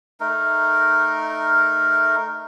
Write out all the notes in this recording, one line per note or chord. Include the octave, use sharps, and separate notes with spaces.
A3 D#4 A#4